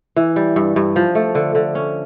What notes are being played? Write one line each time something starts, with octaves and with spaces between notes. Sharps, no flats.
E3
G3
G2
G2
F3
A3
D3
D3
C#4